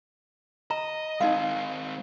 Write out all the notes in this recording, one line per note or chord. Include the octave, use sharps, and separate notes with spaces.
D#5 A#5
G#3 C4 D#4 D#5 F5